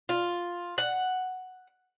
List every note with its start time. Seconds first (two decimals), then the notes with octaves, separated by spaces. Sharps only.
0.09 F4
0.78 F#5